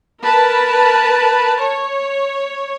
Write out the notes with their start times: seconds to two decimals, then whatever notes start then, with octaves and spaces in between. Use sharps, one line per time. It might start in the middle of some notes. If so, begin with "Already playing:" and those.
0.22 A#4 B4 A5
1.59 C#5